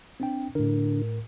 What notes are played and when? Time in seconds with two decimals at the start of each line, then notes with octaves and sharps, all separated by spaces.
0.20 C4 D4 G5
0.55 A2 D3 A#4